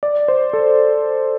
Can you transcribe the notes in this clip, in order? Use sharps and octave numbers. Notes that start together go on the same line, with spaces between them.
D5
C5
A4